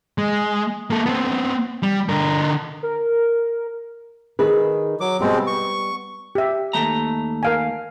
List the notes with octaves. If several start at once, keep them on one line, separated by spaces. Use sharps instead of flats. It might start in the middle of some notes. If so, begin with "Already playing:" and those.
G#3
A#3 A4
B3 C4
G3
D3 A#4
A#4
D#3 G#4 B4
F#3 D6
B2 G3 G#3 B3 C4
C#6
G4 E5
D#2 A3 A#5
A#4 F5 G#5